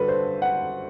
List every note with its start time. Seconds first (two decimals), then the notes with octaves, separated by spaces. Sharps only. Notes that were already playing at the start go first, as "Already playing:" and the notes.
Already playing: G2 D3 G3 F#4 A4 B4
0.08 C5
0.42 F#5